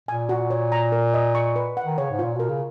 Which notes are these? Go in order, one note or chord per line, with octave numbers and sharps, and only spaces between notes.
A#2 G#5
F#4
C#5
A#5
A#4
D#5
C#6
B4
F#5
D#3
C#3 C#5
G#2
A#2 F4
B2 A#4
C#3